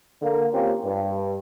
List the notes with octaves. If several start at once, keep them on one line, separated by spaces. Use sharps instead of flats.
D3 A#3
A#3 C4 C#4 F4 G4
G2